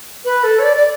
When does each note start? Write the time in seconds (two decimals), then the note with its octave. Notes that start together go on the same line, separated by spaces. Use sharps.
0.25 B4
0.44 A4
0.59 C#5
0.64 D5
0.77 D5